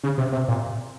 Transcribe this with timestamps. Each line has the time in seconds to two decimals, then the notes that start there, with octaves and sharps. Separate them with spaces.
0.04 C#3
0.18 C3
0.32 C3
0.48 A#2